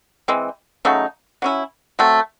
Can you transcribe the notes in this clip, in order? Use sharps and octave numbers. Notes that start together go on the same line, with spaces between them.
E3 G#3 C4
C#3 F#3 A3 D#4
F#3 C#4 E4
F#3 A3 C4